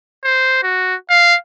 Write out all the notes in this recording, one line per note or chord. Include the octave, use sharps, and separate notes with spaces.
C5
F#4
F5